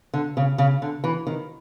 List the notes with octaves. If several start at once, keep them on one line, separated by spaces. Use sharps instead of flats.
D3
C#3
C#3
D3
E3
D#3